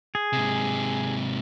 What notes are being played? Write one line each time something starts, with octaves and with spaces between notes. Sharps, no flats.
G#4
G#2 C3